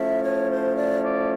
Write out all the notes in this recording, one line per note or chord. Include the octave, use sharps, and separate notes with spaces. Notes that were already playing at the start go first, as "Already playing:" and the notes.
Already playing: A2 F3 A3 C#4 E5
C#5
C5
D5
D5